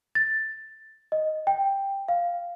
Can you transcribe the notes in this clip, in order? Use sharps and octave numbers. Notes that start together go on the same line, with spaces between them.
A6
D#5
G5
F5